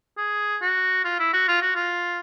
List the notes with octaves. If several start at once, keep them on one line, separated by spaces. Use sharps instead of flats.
G#4
F#4
F4
E4
F#4
F4
F#4
F4